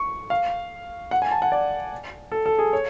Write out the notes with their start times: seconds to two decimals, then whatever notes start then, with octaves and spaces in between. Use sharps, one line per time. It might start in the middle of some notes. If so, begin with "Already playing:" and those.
Already playing: C#6
0.30 F5
1.11 F#5
1.22 G#5
1.31 A5
1.42 F#5
1.52 D5
2.32 A4
2.46 A4
2.59 G#4
2.73 C#5